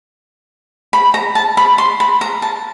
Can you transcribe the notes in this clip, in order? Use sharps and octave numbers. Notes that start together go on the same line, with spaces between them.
B5
A#5
A5
B5
C6
B5
A#5
A5